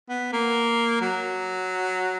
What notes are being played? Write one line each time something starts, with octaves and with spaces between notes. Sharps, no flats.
B3
A#3
F#3